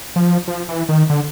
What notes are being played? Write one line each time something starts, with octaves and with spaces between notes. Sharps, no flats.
F3
F3
E3
D#3
D3